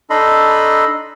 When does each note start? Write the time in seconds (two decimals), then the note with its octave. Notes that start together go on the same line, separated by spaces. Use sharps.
0.10 D4 D#4 A4 D#5 B5 C6